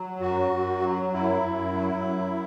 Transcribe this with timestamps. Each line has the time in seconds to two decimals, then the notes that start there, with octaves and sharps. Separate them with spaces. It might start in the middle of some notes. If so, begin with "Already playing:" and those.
Already playing: F#3
0.20 F#2 F#4
0.51 F#2
0.81 F#3
1.12 F#2 E4
1.43 F#2
1.73 F#3
2.04 F#2